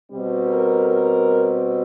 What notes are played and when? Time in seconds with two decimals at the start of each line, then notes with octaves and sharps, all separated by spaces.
0.11 B2 G3 C4
0.47 A#4
0.83 A#4